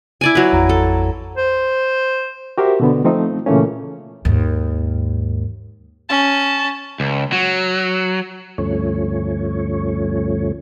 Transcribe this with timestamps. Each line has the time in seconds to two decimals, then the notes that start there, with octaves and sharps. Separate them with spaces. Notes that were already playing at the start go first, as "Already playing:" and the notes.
0.21 E4 D5 G#5
0.35 F#3 B4
0.52 A1 F2 A#5
0.69 A4
1.38 C5
2.58 F#4 G4 A#4 C5 E5
2.80 B2 D3 B3
3.04 F3 A3 C4 D#4
3.46 A#2 C#3 E3 A3 A#3 C#4
4.25 D#2 G#2
6.09 C#4 A5
7.00 C#2
7.33 F#3
8.58 D2 G2 F3 A3 C#4 C#5